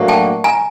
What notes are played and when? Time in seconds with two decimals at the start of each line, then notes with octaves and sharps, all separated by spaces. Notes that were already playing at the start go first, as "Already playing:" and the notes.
Already playing: A2 F#3 A#3 D4 F#4
0.08 G5 A5
0.44 G#5 A#5